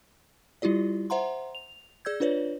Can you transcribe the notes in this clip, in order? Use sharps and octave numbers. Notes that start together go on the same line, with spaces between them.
G3 E4 F4 G4 D5
C5 E5 F#5 A#5 C6
F7
G#4 D5 E6 G6 G#6
D4 F4 B4 C#5 D5